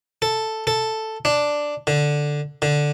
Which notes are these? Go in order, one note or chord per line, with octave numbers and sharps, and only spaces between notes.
A4
A4
D4
D3
D3